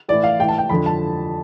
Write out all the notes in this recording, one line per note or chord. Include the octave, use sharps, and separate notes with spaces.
A2 E3 D5
F5
A2 E3 G5
A5
G5
F2 D3 B5
A5